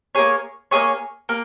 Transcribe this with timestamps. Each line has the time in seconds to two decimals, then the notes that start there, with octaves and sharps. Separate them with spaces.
0.15 A#3 E4 G#4 C#5
0.71 A#3 E4 G#4 C#5
1.29 A#3